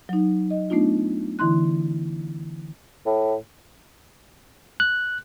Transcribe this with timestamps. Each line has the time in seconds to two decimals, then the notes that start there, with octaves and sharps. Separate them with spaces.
0.09 F#3 D#4
0.51 D#5
0.70 A3 B3 D4 D#4 F4
1.39 D3 E3 E4 C6 F#6
3.06 A2
4.80 F#6